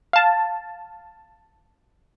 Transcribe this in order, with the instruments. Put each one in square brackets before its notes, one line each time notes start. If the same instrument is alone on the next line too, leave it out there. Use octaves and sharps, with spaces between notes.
[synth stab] F5 A5